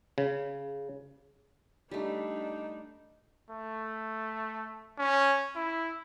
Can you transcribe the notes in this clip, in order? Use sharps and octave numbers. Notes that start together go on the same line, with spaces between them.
C#3
G3 A3 D4 D#4
A3
C#4
E4